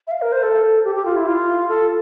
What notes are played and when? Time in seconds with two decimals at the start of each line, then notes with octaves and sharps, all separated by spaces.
0.07 E5
0.11 F5
0.22 A#4
0.32 C5
0.43 A4
0.85 G4
0.95 G4
1.05 F4
1.16 E4
1.27 F4
1.69 A4